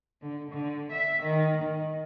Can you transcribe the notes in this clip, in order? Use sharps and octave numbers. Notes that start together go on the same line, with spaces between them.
D3
D3
E5
D#3
D#3